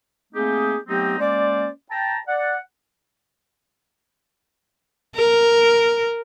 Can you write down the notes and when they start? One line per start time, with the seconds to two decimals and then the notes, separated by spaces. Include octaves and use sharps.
0.33 A3 A#3 C4 D#4 G4 G#4
0.88 F#3 A3 B3 C4 D#4 G4
1.19 G#3 A#3 C#4 C5 D5
1.90 G5 A5 A#5
2.27 D5 F#5
5.16 A#4